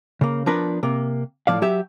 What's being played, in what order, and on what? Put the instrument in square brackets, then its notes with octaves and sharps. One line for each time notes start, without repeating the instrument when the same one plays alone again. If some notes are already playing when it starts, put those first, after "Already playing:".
[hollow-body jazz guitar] C#3 A#3
F3 B3 D4 A#4 B4
C3 A#3
A2 F3 D5 F5
F#3 G4 E5